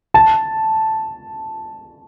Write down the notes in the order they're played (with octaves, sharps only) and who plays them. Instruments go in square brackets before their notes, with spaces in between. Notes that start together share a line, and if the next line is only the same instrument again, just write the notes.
[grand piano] A5